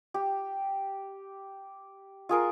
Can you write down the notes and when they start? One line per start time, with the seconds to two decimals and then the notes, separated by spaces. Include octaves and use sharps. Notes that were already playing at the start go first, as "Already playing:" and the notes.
0.14 G4
2.29 F4 G#4 A#4